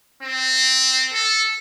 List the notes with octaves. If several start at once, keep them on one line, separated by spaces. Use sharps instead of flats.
C4
A4